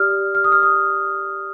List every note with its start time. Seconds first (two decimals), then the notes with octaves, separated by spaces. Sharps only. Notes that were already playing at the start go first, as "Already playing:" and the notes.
Already playing: G4 D5 D#6 F6
0.35 F6
0.44 D#6
0.52 F6
0.63 D#6